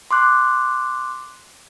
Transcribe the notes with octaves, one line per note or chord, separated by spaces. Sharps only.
C6 D6 F#6